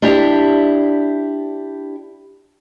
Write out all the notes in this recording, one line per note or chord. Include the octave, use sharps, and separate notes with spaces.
D4 E4 G4